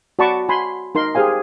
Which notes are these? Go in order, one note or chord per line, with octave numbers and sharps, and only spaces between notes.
F#4 D5 A5 B5 C#6 D6
F#4 G#5 B5 C6
D#4 A#4 C6
G4 G#4 C5 F5 G#5